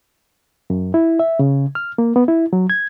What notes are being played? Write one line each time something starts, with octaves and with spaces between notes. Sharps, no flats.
F#2
E4
E5
C#3
F6
A#3
B3
E4
F#3
G#6